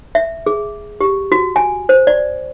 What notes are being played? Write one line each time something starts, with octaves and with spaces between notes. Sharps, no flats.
E5
G#4
G4
F#4
G#5
C5
D5